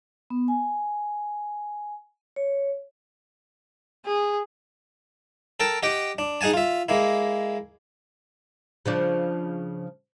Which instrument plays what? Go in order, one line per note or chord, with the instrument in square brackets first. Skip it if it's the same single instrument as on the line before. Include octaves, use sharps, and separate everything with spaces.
[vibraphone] B3
G#5
C#5
[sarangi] G#4
[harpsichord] A4 A#4 G5 A5
G4 D#5 F#5 G5
D4
D#4 G#4 F#5 G#5 A5
F4 E5
G#3 A#3 E4
[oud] C#3 F3 D4